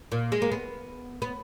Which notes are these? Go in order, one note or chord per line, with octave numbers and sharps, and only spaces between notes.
A#2
G#3
A#3
B3
B3